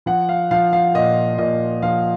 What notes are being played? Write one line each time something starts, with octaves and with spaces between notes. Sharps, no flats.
F3 F#5
F5
F3 F5
F5
A#2 D#5
A#2 D#5
F3 F5